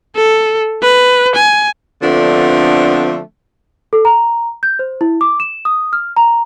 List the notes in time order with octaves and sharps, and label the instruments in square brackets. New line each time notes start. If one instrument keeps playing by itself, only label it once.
[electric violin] A4
B4
G#5
[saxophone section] D3 F3 A3 B3 C4 D4
[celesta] A4
A#5
G6
C5
E4
D6
E7
D#6
F6
A#5